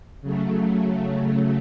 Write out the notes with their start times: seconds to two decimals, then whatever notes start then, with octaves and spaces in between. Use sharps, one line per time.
0.22 C#3 F#3 A3